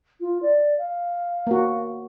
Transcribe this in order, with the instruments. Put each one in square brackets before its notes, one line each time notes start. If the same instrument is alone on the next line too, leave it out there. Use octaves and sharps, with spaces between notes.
[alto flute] F4
D5
F5
[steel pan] A#3 F#4